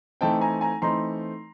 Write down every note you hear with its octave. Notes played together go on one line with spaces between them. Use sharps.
E3 A3 C4 D#4 G5 A5
G#5 A#5
G#5 A#5
E3 A3 C4 D#4 A#5 C6